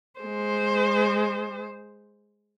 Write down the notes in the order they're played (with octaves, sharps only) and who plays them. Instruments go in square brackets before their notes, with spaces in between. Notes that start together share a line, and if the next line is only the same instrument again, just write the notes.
[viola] G#3 C5